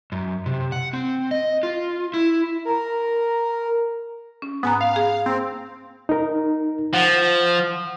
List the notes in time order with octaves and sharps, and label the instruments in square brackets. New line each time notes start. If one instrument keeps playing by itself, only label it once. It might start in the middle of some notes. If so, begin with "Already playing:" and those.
[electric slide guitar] F#2
C3
F#5
C4
D#5
F4
E4
[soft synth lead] A#4
[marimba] C#4
[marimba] G#2 G#5 A#5 [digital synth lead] B3
[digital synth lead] F5
[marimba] G#4
[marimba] A#3 [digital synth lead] C4
[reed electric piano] D#4 A#4
[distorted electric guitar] F3 [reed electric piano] F#5